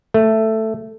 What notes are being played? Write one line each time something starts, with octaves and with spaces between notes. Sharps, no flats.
A3